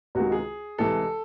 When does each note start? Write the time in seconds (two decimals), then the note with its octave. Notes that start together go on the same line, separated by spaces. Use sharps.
0.15 C#2 C3 D#3 G#3 F#4
0.32 G#4
0.78 C2 C3 E3 G#3 A4